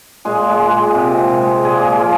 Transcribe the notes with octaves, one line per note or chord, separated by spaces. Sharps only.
A#2 G#3 G#4
G#3
A#2
C3
C3
G#3
A#2 G#3 G#4
G#3
F3 F4